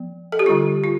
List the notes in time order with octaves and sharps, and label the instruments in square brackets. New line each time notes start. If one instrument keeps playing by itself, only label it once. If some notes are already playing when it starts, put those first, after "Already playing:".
Already playing: [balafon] F3 B3
A4
G4
D3 G3 C4 F4
F4